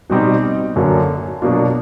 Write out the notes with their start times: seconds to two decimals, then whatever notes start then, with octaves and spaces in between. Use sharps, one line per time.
0.10 B2 G3 C4 D#4 G4
0.76 F#2 D3 F#3 A#3
1.42 B2 F#3 A#3 D4 F4